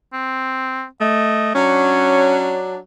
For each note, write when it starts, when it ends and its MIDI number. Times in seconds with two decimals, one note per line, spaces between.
0.13 0.86 60
1.01 1.55 57
1.01 1.51 75
1.55 2.77 54
1.55 2.62 61
1.55 2.77 62
1.55 2.41 73